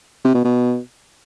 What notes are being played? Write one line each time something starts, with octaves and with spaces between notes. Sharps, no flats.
C3
B2
B2